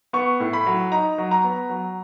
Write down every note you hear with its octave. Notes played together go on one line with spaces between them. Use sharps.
B3 C#6
A2
B5
F#3
D#4 A#5
F#3
A#5
B3
F#3